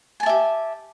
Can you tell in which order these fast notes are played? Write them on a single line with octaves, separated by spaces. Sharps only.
G#5 A5 E5 G4